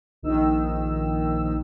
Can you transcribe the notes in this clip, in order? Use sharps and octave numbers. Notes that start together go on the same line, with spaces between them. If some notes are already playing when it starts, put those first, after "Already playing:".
A#1 D#3 E6